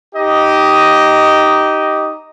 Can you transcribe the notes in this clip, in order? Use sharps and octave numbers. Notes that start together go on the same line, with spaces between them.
D#4 G4 D#5